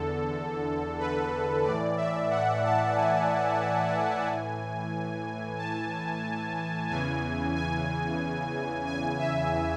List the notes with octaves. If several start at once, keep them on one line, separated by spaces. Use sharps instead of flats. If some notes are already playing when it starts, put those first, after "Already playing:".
Already playing: E2 D3 A4
B4
A2 E3 D5
E5
F#5
A5
G#5
A2 E3
A5
E2 C#3 E3 G#5
G#5
G#5
E5